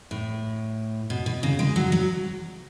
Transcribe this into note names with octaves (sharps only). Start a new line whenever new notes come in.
A2
B2
B2
C#3
G#3
F#3
F#3